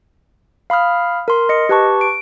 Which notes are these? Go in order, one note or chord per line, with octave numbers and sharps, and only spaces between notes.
F5 B5 D#6 F6
A#4 C6
D#5 C#7
G4 B4 A5 C#6
D7